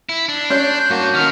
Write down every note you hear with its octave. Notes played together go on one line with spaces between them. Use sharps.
E4
D4
C#4 C#5 C6 F#6 G6
G2 A#3 F#4 A5
D#3 B3 F6